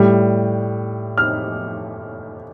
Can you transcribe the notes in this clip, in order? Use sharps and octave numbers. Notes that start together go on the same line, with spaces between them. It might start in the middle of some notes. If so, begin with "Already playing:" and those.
Already playing: A2 G3
F6